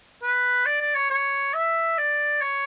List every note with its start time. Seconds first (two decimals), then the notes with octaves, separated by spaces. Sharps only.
0.23 B4
0.66 D5
0.81 D5
0.95 C#5
1.11 C#5
1.54 E5
1.98 D5
2.41 C#5